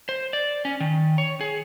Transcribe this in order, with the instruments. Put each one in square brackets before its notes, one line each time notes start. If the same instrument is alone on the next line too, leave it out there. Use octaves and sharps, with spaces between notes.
[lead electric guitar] C5
D5
C#4
D#3
C#5
G#4